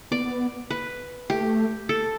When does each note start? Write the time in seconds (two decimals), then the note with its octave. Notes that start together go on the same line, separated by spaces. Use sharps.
0.11 B3 D5
0.71 B4
1.30 A3 G4
1.89 A4